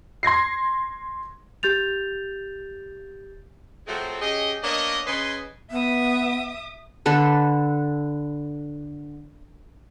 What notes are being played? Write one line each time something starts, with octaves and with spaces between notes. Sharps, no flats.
C6 G#6 A#6 C7
G4 G6 A6 F7
F3 F#3 G#3 A3 C4
C#4 G4 G#4 D#5
A#3 B3 D4 C#5 D#5
C#3 G#4 B4 D#5 G#5 C6
B3 E5 D#6
D3 A4 B4